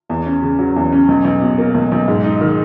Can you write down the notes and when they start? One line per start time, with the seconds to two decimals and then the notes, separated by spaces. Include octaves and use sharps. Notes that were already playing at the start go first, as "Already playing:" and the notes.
0.10 E2
0.26 C#4
0.42 C#3
0.59 F#3
0.76 E2
0.92 C#4
1.08 B1
1.25 B1
1.42 B2
1.58 A#3
1.74 B1
1.92 B1
2.08 G#2
2.24 D#4
2.41 D#3